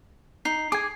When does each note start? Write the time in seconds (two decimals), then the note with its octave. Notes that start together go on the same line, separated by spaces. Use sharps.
0.45 D#4 C7
0.72 G#4 G#5 D6